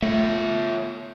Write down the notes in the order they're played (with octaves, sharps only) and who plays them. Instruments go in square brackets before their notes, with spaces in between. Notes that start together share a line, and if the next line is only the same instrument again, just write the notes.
[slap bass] A3 [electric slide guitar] F4 C#5 E5